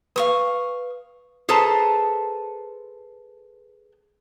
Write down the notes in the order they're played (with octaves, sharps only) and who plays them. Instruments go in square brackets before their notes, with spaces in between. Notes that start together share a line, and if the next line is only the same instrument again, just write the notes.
[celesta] B4 [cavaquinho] F5 C#6 D#6
[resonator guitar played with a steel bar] G#4 A4 B4 C5 A5 A#5